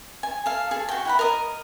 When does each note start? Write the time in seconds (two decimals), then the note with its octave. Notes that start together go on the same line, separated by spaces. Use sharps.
0.23 G#5
0.46 A4 F5
0.71 G#4 A4
0.89 F#4 G5
1.05 E4 F#5 B5
1.19 A#4 D#5